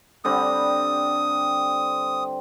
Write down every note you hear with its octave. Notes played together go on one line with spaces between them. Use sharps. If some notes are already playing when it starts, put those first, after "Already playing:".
D3 G3 C4 D#6